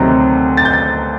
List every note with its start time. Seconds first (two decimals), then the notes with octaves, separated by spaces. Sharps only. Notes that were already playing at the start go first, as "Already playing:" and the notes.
Already playing: D2 C3 D#3 F#3
0.57 A6
0.65 G6
0.73 A6